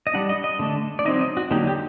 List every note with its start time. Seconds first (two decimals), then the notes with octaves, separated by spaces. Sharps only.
0.07 D#5
0.14 G3 D4 F#5
0.29 D#5
0.44 D#5
0.59 D3 A3 D4
0.99 D5
1.05 F#3 C4 D#4 D#5
1.21 D#5
1.37 F#4
1.51 D3 F#3 A#3 D#4 G4
1.67 G4